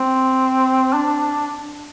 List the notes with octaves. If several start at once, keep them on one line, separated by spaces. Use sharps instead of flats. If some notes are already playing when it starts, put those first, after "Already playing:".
Already playing: C4
D4